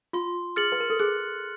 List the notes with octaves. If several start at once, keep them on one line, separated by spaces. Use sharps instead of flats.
F4 C6
G#4 F6 A6 C#7 F#7
B4
A#4
A4
G#4 F#6